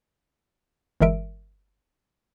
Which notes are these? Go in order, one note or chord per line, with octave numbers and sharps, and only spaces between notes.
G1 E3 G#3 A#4 E5 D7